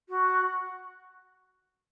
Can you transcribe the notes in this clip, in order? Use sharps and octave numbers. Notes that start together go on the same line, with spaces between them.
F#4